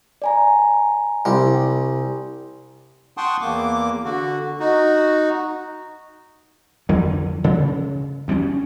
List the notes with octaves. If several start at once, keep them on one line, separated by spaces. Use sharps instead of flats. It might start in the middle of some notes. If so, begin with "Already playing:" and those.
D5 G#5 A#5
C2 G3
F#5 G5 A5 C6 C#6 D#6
E2 A#3 D6
D3 F#4
D#4 F#4
F2 D3 E3 F#3
C#3
D2 G3 A#3 C#4